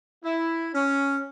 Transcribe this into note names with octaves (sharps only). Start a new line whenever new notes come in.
E4
C#4